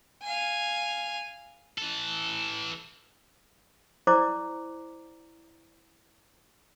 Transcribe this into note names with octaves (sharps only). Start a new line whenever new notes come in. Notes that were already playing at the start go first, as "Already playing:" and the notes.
F5 G#5
E3 A4
E4 C5 D5 A#5 D6